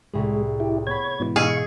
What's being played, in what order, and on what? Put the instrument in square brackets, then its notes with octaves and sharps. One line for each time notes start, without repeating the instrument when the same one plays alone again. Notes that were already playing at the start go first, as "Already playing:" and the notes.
[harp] C2 A2 G#4 [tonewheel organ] G#3
[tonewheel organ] E4 G4
[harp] B3 B5 [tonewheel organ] C#5 G#6
[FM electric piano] G#2 B2 E3
[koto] G#4 [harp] D#5 E6 [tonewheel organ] F5 C#6